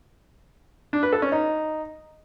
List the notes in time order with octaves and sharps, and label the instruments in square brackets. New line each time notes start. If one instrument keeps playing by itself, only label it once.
[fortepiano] D4
B4
A4
C#4
D#4